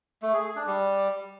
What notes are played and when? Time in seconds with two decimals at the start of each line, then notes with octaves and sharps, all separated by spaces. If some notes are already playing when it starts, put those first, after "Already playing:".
0.22 A3
0.33 G#4
0.44 G#4
0.56 D4
0.67 G3